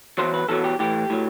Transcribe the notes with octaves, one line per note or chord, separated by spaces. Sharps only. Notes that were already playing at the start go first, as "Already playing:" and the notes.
E2 B2 F#3 C5
B4
E2 B2 F#3 A4
G4
A2 E3 G4
A2 F#3